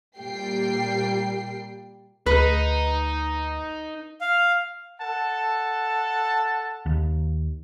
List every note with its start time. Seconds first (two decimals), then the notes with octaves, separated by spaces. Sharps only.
0.18 A#2 G3 A#3 G5 C7
2.26 D2 D#4 B4
4.21 F5
5.01 A4 F#5 A5
6.86 D#2